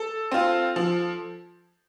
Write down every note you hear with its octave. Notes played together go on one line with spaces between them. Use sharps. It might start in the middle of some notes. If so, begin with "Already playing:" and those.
Already playing: A4
C4 F4
F3